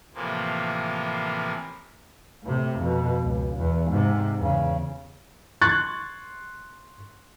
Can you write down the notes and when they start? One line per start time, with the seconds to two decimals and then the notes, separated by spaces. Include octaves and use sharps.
0.14 A2 C3 E3 F3 A#3
2.43 A2 C3
2.79 F2 B2
3.23 C#2
3.57 E2
3.90 G#2 C3
4.38 E2 C#3
5.61 C6 C#6 F#6 G#6 A6